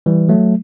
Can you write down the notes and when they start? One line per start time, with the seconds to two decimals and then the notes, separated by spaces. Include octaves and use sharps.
0.06 E3 G3
0.29 F#3 A3